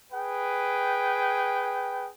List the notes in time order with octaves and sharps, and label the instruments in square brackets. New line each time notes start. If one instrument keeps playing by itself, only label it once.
[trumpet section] G#4 B4 G5